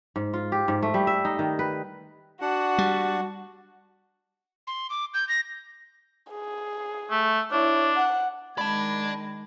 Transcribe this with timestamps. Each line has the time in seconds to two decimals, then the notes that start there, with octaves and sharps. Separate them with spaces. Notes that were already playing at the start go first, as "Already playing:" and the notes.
0.16 G#2
0.34 F4
0.52 G4
0.68 G#2
0.83 A3
0.94 G3
1.07 E5
1.25 D#4
1.39 D#3
1.59 B4
2.41 D4 F#4 F#5
2.78 G3
4.67 C6
4.90 D6
5.14 G6
5.29 A#6
6.31 G#4
7.11 A3
7.52 D4 E4 C#5
7.97 F#5
8.58 D#3 G#3 D5 A5 B5 G#6